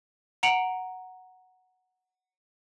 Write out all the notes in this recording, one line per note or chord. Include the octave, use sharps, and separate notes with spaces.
F#5 A#5 C#7 D7 F7 F#7